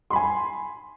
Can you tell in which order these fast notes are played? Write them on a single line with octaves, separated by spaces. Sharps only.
C6 B5 G#5